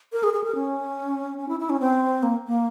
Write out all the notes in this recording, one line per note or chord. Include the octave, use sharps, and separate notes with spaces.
A#4
G#4
G#4
A#4
C#4
C#4
E4
E4
C#4
C4
A#3
A#3